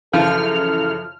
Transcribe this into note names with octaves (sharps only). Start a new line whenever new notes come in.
F#2 C#3 E3 F3 A4 F6